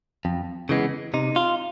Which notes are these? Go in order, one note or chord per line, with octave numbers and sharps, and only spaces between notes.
F2
C#3 E3 G#3 B3
C3 D#4
F4